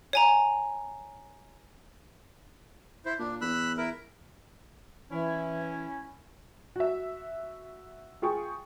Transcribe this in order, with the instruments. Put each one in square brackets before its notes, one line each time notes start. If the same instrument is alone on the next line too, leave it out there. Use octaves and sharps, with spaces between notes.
[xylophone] C#5 G#5 A#5
[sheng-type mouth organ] E4 C5
[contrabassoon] A#2 [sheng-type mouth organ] D4
[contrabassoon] E2 [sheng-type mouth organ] B5 E6 F#6
[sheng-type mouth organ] E4 A#4
[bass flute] E3 [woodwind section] C#4 E4
[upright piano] F#4 E5
F4 G#4 G5 C#6